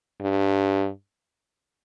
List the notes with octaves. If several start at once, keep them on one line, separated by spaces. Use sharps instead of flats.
G2